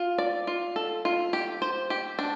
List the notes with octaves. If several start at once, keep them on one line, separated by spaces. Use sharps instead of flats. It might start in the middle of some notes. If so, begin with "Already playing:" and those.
Already playing: F4
D5
F4
A4
F4
G4
C5
G4
D4